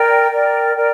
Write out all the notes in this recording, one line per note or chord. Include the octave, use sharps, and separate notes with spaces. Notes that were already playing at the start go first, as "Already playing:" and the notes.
Already playing: A#4 D5 G5
A#4 D5 G5
A#4 D5 G5